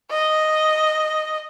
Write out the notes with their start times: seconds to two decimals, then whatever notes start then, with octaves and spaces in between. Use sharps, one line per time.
0.11 D#5